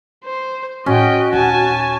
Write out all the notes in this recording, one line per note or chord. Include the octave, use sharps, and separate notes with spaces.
C5
A2 C#4 F#4 D#5 G5
D#1 D#4 G#5 A5